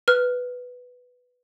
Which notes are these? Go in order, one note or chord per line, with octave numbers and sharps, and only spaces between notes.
B4 F6